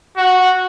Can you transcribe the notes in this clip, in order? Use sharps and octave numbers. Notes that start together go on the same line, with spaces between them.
F#4